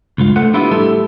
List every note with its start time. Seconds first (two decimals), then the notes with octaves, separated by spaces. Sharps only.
0.18 C#2 G2 F4
0.36 A3 C5 F#5
0.53 B3 D4 E4 F4 G4 B4
0.71 A2 G3 G4 A4 E5